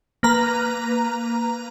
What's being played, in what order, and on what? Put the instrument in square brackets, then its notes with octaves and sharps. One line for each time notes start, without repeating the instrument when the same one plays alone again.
[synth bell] A#3 B4 A#5